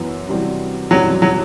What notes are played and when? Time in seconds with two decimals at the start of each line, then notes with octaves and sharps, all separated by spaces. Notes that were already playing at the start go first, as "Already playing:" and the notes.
Already playing: F#2 E3 B3 F#4 B4
0.28 C3 E3 G3 C4 F#4
0.90 F#2 E3 F#3 G3 C4 G4
1.22 F#3